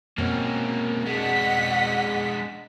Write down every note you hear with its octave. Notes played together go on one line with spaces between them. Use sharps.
G#2 B2 A#3 C4 C#4
G#3 D4 D#5 F#5 B6